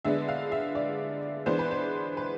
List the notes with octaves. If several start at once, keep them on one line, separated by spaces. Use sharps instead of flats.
D3 G#3 B3 D4 E5
F5
E5
D5
E3 G#3 B3 D4 C5
B4
C5
B4